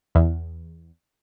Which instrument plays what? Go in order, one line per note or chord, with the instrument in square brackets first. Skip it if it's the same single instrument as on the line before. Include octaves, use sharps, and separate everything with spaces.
[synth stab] E2